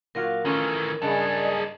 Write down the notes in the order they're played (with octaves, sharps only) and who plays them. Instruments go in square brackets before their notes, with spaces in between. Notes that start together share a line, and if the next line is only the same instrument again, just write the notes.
[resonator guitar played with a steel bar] A#2 F#3 F4 [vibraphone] A#4
[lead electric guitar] D#3 E3 [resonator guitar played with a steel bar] A3 C#4 F4
[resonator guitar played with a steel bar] G2 C#3 [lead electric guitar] D#4 A4 [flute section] G#4 D5 D#5